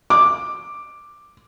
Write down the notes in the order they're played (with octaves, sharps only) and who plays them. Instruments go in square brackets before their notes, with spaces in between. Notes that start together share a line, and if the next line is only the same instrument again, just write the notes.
[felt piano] D6